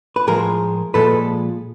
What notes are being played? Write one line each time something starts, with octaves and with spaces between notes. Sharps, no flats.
B4
A2 F3 G#3 G#4 A#4
A#2 F3 G#3 A4 B4